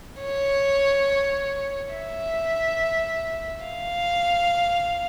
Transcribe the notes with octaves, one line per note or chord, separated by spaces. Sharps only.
C#5
E5
F5